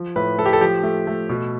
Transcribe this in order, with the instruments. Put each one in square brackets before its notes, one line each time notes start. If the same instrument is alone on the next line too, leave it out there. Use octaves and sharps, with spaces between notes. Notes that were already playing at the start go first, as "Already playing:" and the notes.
Already playing: [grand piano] F3
A2 B4
A3 A4
G4
A4
F3 G4
A3
A3
B2